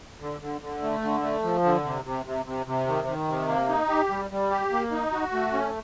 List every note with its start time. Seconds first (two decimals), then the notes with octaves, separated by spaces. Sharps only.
0.20 D3
0.41 D3
0.61 D3
0.82 A3
1.02 D3
1.23 A3
1.43 F3
1.64 D3
1.84 C3
2.05 C3
2.26 C3
2.45 C3
2.66 C3
2.87 D#3
3.07 D#3
3.28 C3
3.48 A#3
3.69 D#4
3.89 G4
4.09 G3
4.31 G3
4.51 G4
4.71 A#3
4.92 D#4
5.12 F#4
5.33 A3
5.53 C#4